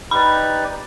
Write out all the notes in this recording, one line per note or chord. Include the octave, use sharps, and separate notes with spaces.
D#4 G4 B4 D5 B5